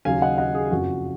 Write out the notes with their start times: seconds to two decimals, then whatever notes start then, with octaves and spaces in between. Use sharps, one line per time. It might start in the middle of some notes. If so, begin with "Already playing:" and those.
0.05 D#2 C#3 F#3 F5 G#5
0.22 D#5 F#5
0.38 D#5 F#5
0.55 G#4
0.71 F#1 F2 C#3 F3 F#4